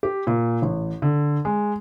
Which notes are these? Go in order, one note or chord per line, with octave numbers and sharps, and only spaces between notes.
G4
A#2
A1
D3
G#3